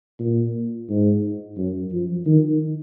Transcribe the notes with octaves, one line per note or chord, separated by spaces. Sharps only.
A#2
G#2
F#2
F3
D#3